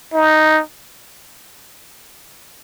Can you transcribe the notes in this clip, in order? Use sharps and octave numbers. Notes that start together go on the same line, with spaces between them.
D#4